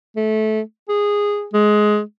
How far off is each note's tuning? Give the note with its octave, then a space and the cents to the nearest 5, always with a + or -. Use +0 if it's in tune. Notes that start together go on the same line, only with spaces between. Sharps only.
A3 -20
G#4 -10
G#3 +15